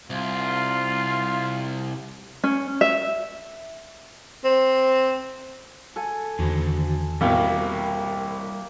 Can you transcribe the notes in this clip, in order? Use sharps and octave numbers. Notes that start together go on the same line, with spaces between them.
C2 F4
C#4
E5
C4
A4 G#5
E2 D3 D#3 F#4
C2 B2 G3 A#3 G4 C#5